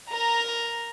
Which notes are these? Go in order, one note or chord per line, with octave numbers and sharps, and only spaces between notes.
A#4 A#5